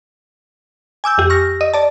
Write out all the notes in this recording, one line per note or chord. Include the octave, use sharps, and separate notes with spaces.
G#5 D6 E6 G6
F2 G4
C#6 F6 A#6
D#5
D5 A5